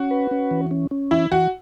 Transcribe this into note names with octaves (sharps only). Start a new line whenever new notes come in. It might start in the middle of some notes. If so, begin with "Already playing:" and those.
Already playing: C#4 F#4
B4
C#4
E3
C#4
C#4
E3 E4
E3 F#4